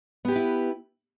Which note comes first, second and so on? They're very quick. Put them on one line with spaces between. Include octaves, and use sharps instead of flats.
B3 G4 B4 E4